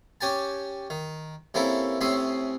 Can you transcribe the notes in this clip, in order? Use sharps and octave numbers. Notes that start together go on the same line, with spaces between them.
C#4 G4 G#5 A5
D#3
C3 A#3 C#4 E4 A4
A2 C3 C#4 E5 C6 D#6